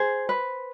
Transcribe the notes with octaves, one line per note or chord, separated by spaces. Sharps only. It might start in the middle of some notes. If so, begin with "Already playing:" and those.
Already playing: G#4 C5
B4